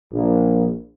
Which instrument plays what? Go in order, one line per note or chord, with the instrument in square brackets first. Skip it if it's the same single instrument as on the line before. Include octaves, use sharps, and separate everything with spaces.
[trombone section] A#1